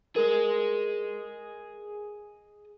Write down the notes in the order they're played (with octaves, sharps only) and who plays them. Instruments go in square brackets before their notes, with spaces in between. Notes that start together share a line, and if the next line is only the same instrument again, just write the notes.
[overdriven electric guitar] G#4 D#5 [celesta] A#4